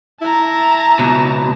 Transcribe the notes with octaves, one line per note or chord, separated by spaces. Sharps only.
E4 A5 A#5
C#2 B2